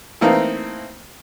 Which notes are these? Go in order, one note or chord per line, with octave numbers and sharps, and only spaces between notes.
E3 A3 A#3 C4 D#4